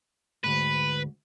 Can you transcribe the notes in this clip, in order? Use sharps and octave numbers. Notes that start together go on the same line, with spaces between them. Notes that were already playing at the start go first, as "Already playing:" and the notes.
D2 G#2 B4